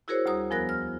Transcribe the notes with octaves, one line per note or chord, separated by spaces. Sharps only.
E4 F#4 G#4 A#4 C5 C#5
D2 G3 A#5 D#6
E2 F3 B3 A#4 F#6 A#6
F6